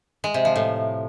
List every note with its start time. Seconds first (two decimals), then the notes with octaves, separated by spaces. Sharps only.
0.24 G#3
0.34 C3
0.45 F3
0.56 A2